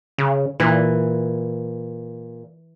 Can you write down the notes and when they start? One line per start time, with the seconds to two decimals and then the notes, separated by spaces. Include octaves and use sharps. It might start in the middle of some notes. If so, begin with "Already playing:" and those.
0.18 C#3
0.60 A#2 E3